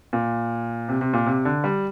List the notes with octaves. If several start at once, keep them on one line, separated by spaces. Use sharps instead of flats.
A#2
C3
C3
A#2
C3
D3
G3